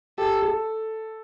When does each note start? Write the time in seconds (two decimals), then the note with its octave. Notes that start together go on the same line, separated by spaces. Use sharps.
0.18 G4 A4
0.42 A4